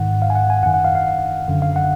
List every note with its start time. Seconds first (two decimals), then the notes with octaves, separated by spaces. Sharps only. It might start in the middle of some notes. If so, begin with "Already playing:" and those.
Already playing: G#2 D#3 F#5
0.22 F5
0.30 G#5
0.35 F#5
0.50 G#5
0.63 F#2 F#5
0.66 D#3
0.74 F#5
0.85 F5
0.95 F5
1.48 F#2 D3
1.62 F5
1.76 F#5